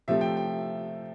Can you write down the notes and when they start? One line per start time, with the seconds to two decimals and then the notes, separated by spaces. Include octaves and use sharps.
0.08 C3 F3 A3 E5
0.21 G5
0.37 G5